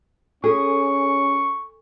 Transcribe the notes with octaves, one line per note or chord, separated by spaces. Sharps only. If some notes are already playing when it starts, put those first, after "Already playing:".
C#4 F4 G#4 A4 C#6